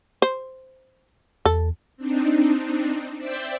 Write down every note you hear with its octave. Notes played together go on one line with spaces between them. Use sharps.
C5
E2 A4
C4 D4 D#4
C5 D5 E5 G5